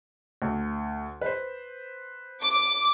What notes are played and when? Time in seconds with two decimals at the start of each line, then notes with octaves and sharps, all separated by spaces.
0.42 D2
1.21 B4 C5
2.41 D6